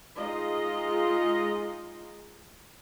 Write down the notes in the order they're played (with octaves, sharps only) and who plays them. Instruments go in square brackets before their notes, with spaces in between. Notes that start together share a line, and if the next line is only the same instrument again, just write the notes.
[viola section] G#3 D#4 F4 D#5